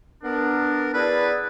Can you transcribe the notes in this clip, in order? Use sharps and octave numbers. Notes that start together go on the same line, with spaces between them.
B3 D4 A#4
B3 E4 G#4 A4 B4 D5